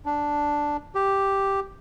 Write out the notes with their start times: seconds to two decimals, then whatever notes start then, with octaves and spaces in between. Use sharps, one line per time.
0.05 D4
0.95 G4